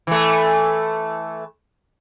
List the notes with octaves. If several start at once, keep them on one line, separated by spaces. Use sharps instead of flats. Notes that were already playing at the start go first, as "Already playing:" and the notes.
E3 A3